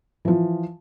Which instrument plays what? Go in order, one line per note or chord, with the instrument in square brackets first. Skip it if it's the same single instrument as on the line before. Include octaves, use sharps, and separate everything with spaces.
[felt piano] E3 F3